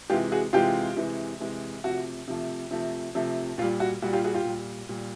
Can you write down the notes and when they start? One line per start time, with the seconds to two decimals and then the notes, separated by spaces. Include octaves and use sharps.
0.10 C3 E3 G#3 F4 G4
0.32 F#4 G#4
0.53 C3 E3 G#3 F4 G4
0.96 C3 E3 G#3
1.40 C3 E3 G#3
1.84 C3 F3 A3 F#4
2.28 C3 F3 A3
2.71 C3 F3 A3
3.15 C3 F3 A3
3.58 A#2 F4
3.62 G3
3.80 F#4
4.02 A#2 G3 F#4
4.13 F4 G4
4.24 F#4 G#4
4.34 F4 G4
4.45 A#2 G3
4.89 A#2 G3